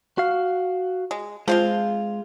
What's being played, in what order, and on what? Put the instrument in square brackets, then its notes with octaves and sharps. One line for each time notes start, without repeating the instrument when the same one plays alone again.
[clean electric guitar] F#4 F5
[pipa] G#3
[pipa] F3 C4 F4 [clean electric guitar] G#3